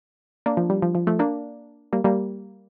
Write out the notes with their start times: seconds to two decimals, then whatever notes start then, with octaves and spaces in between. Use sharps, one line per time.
0.46 A#3 D4
0.57 F3
0.70 G3
0.82 F3
0.95 F3
1.07 F3 A3
1.19 A#3 D4
1.93 G3 A#3
2.04 G3 A#3